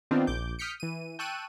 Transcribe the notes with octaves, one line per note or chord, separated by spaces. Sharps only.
D#3 B3 C4 D4 D#4 F4
A#1 D6 G6
D#6 F6 G6 B6 C#7 D7
E3 D#7
G5 A5 C#6 E6 F#6 D#7